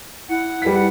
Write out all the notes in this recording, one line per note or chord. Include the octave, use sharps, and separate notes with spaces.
E4 F#5
G3 B4 B6
F#5